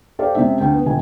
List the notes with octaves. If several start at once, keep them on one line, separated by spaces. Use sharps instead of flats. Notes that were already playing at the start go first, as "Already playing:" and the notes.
G4 A4 C5 D5 F5
C3 G#3 C#4 E5
D2 G5
B3
E1 D#2 D#3 G#5